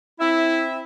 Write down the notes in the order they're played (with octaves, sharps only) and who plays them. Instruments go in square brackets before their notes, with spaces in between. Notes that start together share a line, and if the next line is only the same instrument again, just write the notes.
[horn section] C4 E5 [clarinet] E4